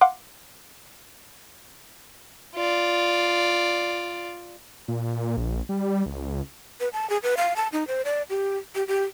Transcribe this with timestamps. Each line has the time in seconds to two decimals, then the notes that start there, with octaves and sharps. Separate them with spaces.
0.01 F5 F#5 C6 D6
2.55 F4 D5
4.88 A#2
5.37 A#1
5.69 G3
6.06 C#2
6.80 B4
6.93 A5
7.10 G#4
7.23 B4
7.37 F5
7.56 A5
7.73 D#4
7.88 C5
8.05 D5
8.30 G4
8.75 G4
8.88 G4